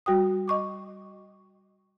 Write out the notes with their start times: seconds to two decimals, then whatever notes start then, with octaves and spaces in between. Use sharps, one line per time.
0.06 G3 F#4 G5 D#6
0.48 D#5 C#6 D6